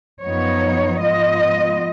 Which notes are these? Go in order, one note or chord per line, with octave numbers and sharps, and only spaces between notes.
F#2 F3 B3 D#4 C#5
G#2 F3 B3 F4 D#5